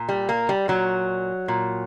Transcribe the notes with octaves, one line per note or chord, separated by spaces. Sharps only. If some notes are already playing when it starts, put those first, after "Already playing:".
Already playing: A#2
G3
A#3
G3
A#2 F#3
A#2